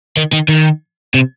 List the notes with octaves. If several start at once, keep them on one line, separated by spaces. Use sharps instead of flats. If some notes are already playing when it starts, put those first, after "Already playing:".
D#3
D#3
D#3
C3